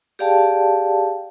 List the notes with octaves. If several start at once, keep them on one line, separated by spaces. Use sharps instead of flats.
G4 G#4 D5 F5 G5 A5